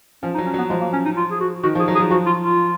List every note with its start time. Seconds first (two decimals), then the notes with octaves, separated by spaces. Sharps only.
0.23 F3 C#4
0.34 D#4
0.38 F#3
0.46 C#4
0.54 F#3 B3
0.70 F3 G#3
0.81 A#3
0.93 C#4
1.05 D#4
1.17 F4
1.31 G#4
1.40 F#4
1.63 D#3 F#4
1.75 F3 G#4
1.88 F#3
1.95 G#4
1.99 F3
2.11 F3 F#4
2.26 F4
2.43 F4